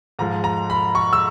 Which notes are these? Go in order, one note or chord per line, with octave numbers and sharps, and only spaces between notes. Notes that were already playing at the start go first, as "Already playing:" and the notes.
G#2 F3 G#3 A#5
A#5
B5
C#6
E6